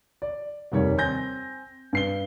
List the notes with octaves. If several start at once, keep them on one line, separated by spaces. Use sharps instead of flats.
D5
F1 D#2 G3 C#5
C4 G#5 G6 A#6
G2 C7 G7